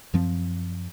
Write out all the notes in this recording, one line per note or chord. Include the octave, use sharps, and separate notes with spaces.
F#2 F3 C4